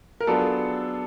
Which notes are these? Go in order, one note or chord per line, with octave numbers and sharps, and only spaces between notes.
A#4
F#3 B3 D4 F4 G#4 A4